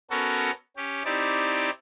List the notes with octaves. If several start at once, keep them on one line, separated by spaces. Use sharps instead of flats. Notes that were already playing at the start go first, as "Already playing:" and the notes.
B3 C#4 F#4 A4 A#4
C#4 G4
C4 D#4 E4 G4 D5